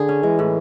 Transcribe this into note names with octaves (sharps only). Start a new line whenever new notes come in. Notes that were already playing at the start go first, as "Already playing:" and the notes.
Already playing: D3 G#4
C#4
E3 G#3
A2